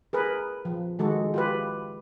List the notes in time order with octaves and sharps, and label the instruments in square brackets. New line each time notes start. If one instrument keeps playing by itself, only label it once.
[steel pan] G#4 A#4 B4
F3
D#3 G#3 F#4 A4
F4 G4 B4